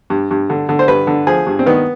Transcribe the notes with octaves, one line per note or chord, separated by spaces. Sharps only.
G2
G2
D3
D3
C5
G2 B4
D3
F3 G#4
G2
C4
D#3 B3